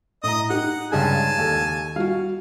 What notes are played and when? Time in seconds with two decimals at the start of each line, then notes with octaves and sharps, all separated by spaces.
0.24 A2 D#5 A#5 D#6
0.50 D#4 G4 F#5
0.92 C#2 G2 G#4 G#5 A5
1.38 D#2 A4
1.96 G3 F#4 F5